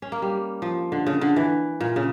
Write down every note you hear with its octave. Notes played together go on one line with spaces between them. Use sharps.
C#4
A#3
G3
F3
D3
C#3
D3
E3
A#2
C#3